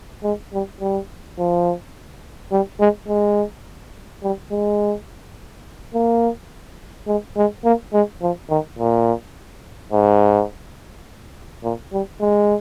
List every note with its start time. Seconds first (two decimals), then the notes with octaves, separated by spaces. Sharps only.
0.24 G#3
0.53 G3
0.81 G3
1.38 F3
2.52 G3
2.80 G#3
3.08 G#3
4.23 G3
4.51 G#3
5.94 A#3
7.07 G#3
7.37 G#3
7.64 A#3
7.93 G#3
8.22 F3
8.50 D#3
8.79 A#2
9.92 G#2
11.63 A#2
11.93 G3
12.21 G#3